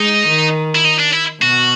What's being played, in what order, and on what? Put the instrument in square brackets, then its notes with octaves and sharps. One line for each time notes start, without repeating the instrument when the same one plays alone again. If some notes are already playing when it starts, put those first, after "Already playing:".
Already playing: [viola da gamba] G#3 [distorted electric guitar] D#4
[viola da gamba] D#3
[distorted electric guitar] E4
D#4
D4
E4
[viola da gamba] B2 [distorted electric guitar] F#4